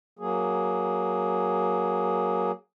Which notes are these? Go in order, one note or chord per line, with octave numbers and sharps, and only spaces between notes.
F#3 A#3 G#4